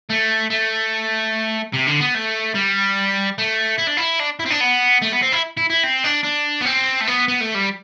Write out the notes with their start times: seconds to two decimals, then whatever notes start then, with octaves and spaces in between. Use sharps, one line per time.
0.10 A3
0.50 A3
1.73 C3
1.87 D3
2.00 B3
2.14 A3
2.55 G3
3.38 A3
3.78 E4
3.88 D4
3.97 E4
4.20 D4
4.40 E4
4.46 C4
4.51 D4
4.61 B3
5.02 A3
5.13 B3
5.23 C4
5.33 E4
5.57 E4
5.70 E4
5.83 C4
6.04 D4
6.24 D4
6.61 B3
6.65 C4
7.01 A3
7.07 B3
7.28 B3
7.41 A3
7.55 G3